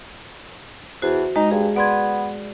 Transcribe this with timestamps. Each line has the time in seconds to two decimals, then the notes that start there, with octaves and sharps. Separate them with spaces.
1.02 E2 F#4 C5
1.36 G#3 D#4
1.51 G2 G#4
1.76 B3 D5 C6 G#6